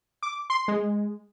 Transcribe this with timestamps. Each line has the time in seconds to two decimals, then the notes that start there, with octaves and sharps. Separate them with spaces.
0.23 D6
0.50 C6
0.68 G#3